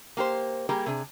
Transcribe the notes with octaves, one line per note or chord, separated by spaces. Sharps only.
A#3 G4 C5
G3 A#3 G4 G#4 A#4
C3 D4 G#4